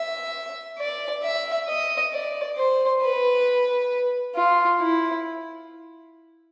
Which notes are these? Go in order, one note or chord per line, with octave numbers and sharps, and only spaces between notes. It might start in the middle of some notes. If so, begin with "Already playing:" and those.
Already playing: E5
D5
E5
D#5
D5
C5
B4
F4
E4